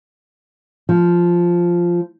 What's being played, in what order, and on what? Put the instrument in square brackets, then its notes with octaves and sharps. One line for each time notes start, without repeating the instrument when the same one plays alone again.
[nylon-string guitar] F3